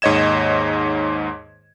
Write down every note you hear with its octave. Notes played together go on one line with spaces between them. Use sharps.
D#2 G#2 C#5 D#5 G#6 E7